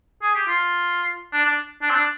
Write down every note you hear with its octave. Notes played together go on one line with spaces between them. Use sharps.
G#4
G4
F4
D4
D4
D4
C4
D4